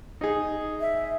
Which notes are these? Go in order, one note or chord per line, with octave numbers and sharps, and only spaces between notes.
D#4 G#4
E5